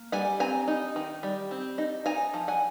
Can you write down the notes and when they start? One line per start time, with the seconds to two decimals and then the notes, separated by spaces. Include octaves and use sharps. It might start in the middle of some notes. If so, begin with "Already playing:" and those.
Already playing: A#3
0.12 G3 F#5 G#5
0.40 C4 G#5 A#5
0.68 D#4
0.96 D#3
1.23 G3
1.51 C4
1.78 D#4
2.06 D#4 G#5 A#5
2.34 F3
2.48 F#5 G#5